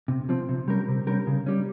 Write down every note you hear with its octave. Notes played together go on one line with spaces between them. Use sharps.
C3
F3 C4
C3
G3 C#4 G4 A#4
C3
G3 C#4 G4 A#4
C#3
G3 C#4